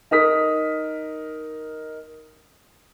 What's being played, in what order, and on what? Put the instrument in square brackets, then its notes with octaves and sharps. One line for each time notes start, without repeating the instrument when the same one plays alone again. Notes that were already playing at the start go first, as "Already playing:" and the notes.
[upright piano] D#4 A#4 D#6 B6